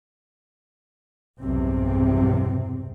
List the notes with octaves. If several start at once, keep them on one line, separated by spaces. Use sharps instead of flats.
B1 E2 G2 C3 C4